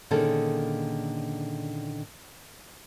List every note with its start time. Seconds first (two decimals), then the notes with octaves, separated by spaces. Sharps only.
0.11 A#2 D3 D#3 C#4 G#4 A4